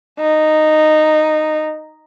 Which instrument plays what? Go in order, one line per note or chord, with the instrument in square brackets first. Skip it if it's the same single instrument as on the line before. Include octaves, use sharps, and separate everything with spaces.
[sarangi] D#4